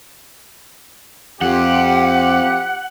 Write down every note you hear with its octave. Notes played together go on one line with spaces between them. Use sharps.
F2 C4 F4 G4 F#5